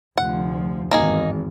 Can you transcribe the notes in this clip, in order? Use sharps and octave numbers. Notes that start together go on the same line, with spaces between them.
F1 D2 F3 F#5
G#1 E2 G2 A#3 D#4 G#4